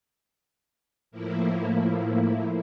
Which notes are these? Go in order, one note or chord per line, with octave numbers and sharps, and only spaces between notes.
A2 F3 A#3 E4